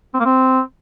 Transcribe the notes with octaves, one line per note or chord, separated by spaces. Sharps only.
C4
A#3
C4